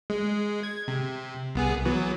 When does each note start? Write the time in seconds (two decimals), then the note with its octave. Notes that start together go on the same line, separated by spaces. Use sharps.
0.10 G#3
0.63 G#6
0.88 C3
1.55 C2 B3 G#4
1.85 E3 F#3 B3